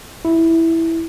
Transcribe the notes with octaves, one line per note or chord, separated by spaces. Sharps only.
E4